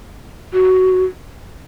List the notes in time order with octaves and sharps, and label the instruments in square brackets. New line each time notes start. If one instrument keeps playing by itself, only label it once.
[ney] F#4